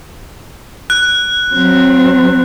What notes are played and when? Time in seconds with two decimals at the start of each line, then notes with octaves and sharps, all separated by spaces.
0.90 F#6
1.54 F#3 C4